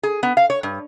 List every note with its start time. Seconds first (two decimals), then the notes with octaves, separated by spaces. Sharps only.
0.03 G#4
0.23 B3
0.37 F5
0.50 C#5
0.63 G2